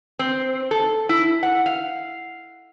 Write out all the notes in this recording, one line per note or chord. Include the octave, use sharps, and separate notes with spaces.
C4
A4
E4
F#5
F5